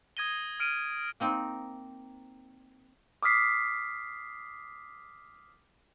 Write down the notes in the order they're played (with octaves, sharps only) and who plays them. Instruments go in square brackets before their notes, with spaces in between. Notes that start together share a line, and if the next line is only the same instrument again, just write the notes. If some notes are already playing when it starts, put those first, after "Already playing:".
[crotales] D#6 G#6 A#6 D#7 G7
F6 D7 D#7
[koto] A#3 C4 D#4
[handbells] D6 D#6 F6 B6 C7